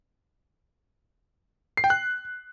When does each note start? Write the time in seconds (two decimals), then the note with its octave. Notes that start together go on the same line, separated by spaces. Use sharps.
1.77 C7
1.84 G5
1.90 F#6